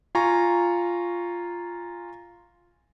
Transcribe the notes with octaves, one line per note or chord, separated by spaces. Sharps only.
F4 G#5 A#5 C#6